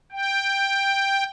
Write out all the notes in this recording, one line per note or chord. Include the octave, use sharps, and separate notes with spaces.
G5